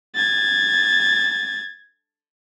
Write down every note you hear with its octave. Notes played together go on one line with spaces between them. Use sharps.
G#6 A6